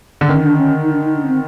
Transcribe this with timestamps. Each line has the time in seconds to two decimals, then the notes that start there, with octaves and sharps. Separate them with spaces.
0.21 D3
0.29 D#3 C#4
0.43 D4
0.58 C#4
0.83 D#4
0.93 D4
1.04 D#4
1.16 D4
1.23 C#4
1.28 C4